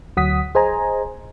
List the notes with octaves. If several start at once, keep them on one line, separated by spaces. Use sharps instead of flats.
D2 F#3 F#5 D#6 B6
G#4 C5 D#5 G#5 A#5